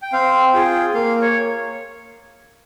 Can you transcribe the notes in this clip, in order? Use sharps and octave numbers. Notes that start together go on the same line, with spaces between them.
G5
C4 F5
F4 G#4 G5
A#3 F5
C#5